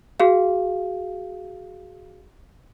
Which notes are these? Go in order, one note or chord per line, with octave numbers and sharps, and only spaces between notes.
F#4 G#4 F5